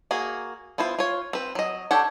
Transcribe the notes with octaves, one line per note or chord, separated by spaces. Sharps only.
A#3 F#4 G#4
B3 E4 F4 C5
F4 C#5
C4 B4
F#3 D#5
D4 G4 A4 C#5 F#5